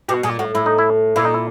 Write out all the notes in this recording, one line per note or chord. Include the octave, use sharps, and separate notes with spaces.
B2 G4
A#2 G#4
A2 F#4
A2 E4
D#4
E4
A#2 E4
D#4
E4